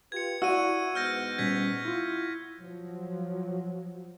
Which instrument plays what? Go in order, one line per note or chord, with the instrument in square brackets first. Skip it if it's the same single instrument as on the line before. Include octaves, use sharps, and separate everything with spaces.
[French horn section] F4 G4 B4 [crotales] G#6 C#7
[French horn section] E4 D5 [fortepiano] F#4 [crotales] E6 D#7
[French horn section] G#2 B3 [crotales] F6 G6 A#6
[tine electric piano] A#2 G3 C#4 [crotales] G#6 B6
[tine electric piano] E4 F4
[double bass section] F3 F#3